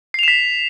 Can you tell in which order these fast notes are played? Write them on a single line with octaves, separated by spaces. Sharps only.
C7 F7 E7 B6